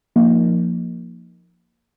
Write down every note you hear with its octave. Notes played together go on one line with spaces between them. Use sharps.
F3 A#3 D#4